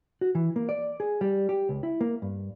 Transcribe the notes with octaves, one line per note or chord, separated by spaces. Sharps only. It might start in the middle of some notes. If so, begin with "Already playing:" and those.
F#4
E3
A#3
D5
G#4
G3
G4
C#2
E4
A#3
G2